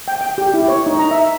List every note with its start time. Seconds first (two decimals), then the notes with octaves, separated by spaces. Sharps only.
0.08 G5
0.21 G5
0.38 G4
0.54 E4
0.68 C#5
0.87 D#4
0.99 A#5
1.11 E5